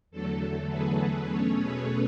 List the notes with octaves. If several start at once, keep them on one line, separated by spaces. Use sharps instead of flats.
E2 D3 F#3 A3 A4
G#4 B4
B2 A3 C#4 A4 C#5
G#4 B4